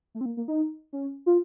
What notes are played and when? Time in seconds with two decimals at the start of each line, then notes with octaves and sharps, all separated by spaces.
0.15 A3
0.21 C4
0.26 A#3
0.37 A#3
0.48 D#4
0.93 C#4
1.26 F4